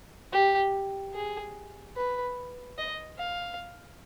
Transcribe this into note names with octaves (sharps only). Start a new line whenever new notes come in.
G4
G#4
B4
D#5
F5